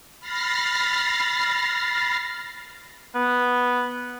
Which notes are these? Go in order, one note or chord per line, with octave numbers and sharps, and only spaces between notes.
B5 F6 A6 A#6 C7
B3